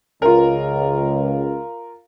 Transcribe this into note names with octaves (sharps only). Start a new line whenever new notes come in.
C#2 F4 A#4